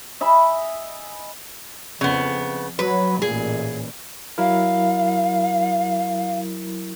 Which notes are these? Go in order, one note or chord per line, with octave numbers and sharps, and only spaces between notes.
D#5 E5 G#5 B5
F2 C#3 B3
F#3 B4
A1 A#2 G#4
F#3 E4 A#4 F5